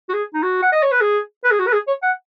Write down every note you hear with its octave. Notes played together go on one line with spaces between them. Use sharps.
F#4
G#4
D#4
F#4
F#5
D#5
C#5
B4
G#4
B4
G#4
F#4
B4
G#4
C#5
F#5